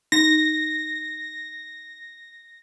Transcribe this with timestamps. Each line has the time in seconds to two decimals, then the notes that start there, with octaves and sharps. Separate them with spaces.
0.12 D#4 A#6